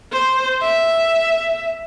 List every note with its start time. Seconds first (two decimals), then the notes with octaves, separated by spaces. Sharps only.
0.13 C5
0.62 E5